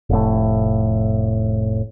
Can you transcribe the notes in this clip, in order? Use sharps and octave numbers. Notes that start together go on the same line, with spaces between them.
F1 A2